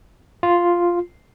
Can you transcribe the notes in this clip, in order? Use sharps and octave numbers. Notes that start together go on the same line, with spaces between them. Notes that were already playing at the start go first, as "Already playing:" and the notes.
F4